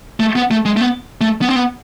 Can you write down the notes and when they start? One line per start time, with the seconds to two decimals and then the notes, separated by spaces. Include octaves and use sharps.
0.20 A3
0.36 B3
0.51 A3
0.65 G#3
0.77 A3
0.81 B3
1.21 A3
1.41 B3
1.48 C4
1.56 B3